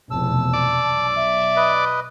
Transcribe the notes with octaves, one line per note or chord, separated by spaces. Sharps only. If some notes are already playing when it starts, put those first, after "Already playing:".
F1 E2 B2 A5 E6
D5
B1
E5
B4 D#5